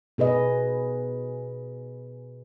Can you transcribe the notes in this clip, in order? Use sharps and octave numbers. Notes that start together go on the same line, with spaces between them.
B2 G#4 B4 D#5